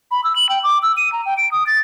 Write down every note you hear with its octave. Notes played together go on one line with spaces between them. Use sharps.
B5
E6
F#7
G5
D6
E6
D#7
A#5
G5
D7
D#6
A6